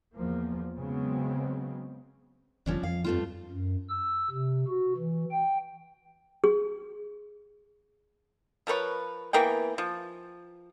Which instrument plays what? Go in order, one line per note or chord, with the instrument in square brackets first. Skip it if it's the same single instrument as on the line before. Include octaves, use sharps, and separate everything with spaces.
[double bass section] E2 F3 A#3
C#3 F#3 G#3 B3 C4
[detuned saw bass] G1 [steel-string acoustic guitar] F3 C#4 D4
[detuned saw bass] F2 [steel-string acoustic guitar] F5
[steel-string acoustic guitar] G2 A3 F4
[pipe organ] F#2
E6
C3
F#4
E3
G5
[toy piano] G#4
[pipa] F3 A#4 B4 C#5
E3 A#3 B3 G5
F3